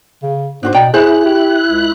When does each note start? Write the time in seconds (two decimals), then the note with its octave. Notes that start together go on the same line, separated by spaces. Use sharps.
0.23 C#3
0.63 G#2 D4 F#4 C5
0.74 B2 D5 G5 A#5
0.94 E4 G#4 C5 F#6
1.26 G4
1.68 C#2